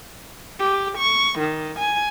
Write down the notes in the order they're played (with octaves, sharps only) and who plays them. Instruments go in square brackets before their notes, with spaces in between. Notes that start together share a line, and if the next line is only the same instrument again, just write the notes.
[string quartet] G4
C#6
D#3
G#5